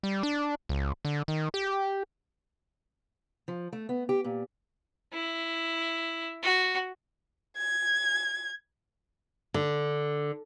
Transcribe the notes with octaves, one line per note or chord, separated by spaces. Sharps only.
G3
D4
C#2
D3
D#3
G4
F3
A3
B3
G4
A#2
E4
F#4
G#6
D3